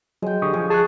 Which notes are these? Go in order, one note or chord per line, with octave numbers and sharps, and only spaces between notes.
F#3 G#3 G5
D3 G4 C#6 D#6
F3 G#5
G#4 A5 C#6 F#6